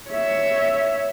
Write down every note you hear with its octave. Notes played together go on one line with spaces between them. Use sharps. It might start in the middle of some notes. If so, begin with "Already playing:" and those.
C#5 E5